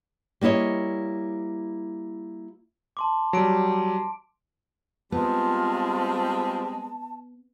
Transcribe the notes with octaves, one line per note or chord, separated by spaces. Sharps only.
G3 A#3 E4 C#5 D#5
A5 C6 D6
F#3 G3 A5 D7
G3 G#3 B3 C4 F4 A5